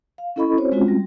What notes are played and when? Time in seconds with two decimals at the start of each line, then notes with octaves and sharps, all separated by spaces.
0.18 F5
0.36 C#4 E4 A4 D#5 B5 C#6
0.58 C4 F#4 C5 C#5
0.72 G#3 C4 C#4 F4 F#4
0.88 G3